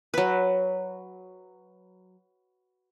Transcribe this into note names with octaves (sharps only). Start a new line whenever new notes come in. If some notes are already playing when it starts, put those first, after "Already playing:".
F#3 B4